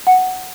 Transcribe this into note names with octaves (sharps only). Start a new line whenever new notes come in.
F#5